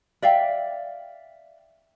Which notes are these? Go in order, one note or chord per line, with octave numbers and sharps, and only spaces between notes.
D5 E5 F5 G5